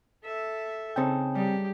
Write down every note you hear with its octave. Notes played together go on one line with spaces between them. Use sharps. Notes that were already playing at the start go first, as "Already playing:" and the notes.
A4 E5
C#3 C4 D#4 G5 A5
G3 D#4 G4